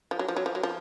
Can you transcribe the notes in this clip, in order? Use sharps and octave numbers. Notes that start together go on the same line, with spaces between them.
F3
F#3
F3
F#3
F3
F#3
F3